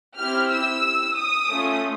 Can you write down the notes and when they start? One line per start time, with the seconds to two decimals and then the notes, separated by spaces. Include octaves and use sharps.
0.18 C4 E4 G4 F6
0.51 E6
1.17 D#6
1.50 A3 C#4 F4